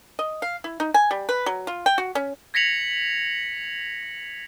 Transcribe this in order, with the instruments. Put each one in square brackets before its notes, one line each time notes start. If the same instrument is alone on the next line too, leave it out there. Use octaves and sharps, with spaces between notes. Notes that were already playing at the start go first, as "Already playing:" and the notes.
[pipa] D#5
F5
E4
D#4
G#5
G3
B4
F#3
F4
G5
F#4
C#4
[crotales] G#6 A#6 B6 C#7 F7 F#7